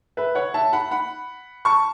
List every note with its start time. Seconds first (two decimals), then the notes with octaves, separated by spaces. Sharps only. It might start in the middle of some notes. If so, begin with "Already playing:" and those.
0.17 B4 E5
0.35 C#5 F#5
0.54 E5 A5
0.73 F#5 B5
0.91 F#5 B5
1.65 A5 C#6